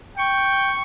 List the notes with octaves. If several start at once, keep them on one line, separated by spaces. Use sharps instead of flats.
G5 C#6